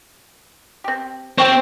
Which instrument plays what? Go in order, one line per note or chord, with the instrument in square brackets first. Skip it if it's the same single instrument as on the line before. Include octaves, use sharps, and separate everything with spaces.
[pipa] C4 G4
[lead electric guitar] C4 [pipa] G4 G5 C#6